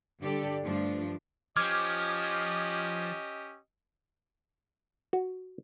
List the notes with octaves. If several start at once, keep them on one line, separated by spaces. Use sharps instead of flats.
G2 D3 D4 G4 A4 D5
G2 F3 A3 D4
F3 C#4 G4 D#5 D6 F6 G#6
F#4